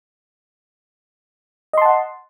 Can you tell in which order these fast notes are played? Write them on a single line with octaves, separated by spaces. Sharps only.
D#5 C6 A5 F#5